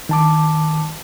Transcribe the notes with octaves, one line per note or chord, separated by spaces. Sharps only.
D#3 A5 D6